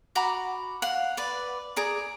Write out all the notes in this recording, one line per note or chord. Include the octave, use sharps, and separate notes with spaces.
F#4 A#5 B5 D6
F5 F#5
B4 D5
G#4 D5 A#5